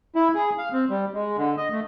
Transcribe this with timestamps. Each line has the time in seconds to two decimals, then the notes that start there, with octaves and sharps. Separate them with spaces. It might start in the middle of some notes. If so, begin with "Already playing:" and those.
0.16 E4
0.35 G#4
0.58 F5
0.73 C4
0.90 G3
1.14 G#3
1.37 D3
1.57 D#5
1.72 A3